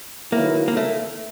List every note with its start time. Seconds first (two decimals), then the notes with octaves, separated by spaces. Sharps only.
0.32 D#3 F#3 A#3 B3 E4
0.68 A#3
0.77 A3